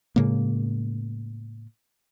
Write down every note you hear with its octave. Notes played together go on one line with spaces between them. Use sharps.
A2 C#3 G#3 A#3